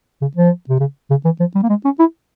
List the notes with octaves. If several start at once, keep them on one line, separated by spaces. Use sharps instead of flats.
C#3
F3
C3
C#3
C#3
E3
F3
G3
A#3
G#3
C#4
E4